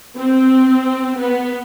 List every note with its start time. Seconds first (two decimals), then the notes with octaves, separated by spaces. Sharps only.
0.16 C4
1.16 B3